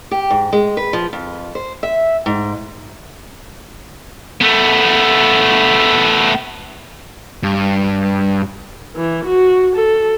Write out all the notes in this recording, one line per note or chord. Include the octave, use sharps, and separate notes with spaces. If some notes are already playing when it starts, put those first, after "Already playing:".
G4
G#2
G#3
B4
F3
F2
C5
E5
G#2
A3 B3
G2
E3
F#4
A4